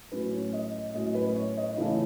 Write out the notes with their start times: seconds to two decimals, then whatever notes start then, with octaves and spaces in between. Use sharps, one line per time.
0.12 A2 F#3 C#4 B4
0.33 C#5
0.53 D#5
0.95 A2 F#3 C#4 D#5
1.15 B4
1.35 C#5
1.57 D#5
1.77 C#3 E3 A3 C#4